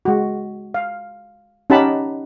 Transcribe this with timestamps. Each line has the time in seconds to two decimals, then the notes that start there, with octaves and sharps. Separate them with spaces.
0.05 G#3 F#4
0.74 F5
1.70 C#4 D#4 G4 F#5 A5 B5